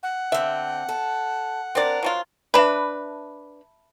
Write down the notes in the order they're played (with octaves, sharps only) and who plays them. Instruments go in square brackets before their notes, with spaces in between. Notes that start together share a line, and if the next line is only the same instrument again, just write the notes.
[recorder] F#5
[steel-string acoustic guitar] D3 C4 [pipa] E5
[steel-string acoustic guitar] A4
[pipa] C4 D5 [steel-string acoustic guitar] D4 A#4
[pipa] F3 F#3 F4
[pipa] D4 B4 [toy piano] E5 A5 B5